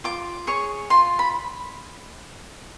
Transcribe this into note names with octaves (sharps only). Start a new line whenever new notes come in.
F4 D6
G#4 C#5 C#6
F4 C6
B5